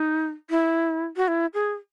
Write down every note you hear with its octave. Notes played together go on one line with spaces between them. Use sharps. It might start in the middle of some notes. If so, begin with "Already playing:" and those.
Already playing: D#4
E4
F#4
E4
G#4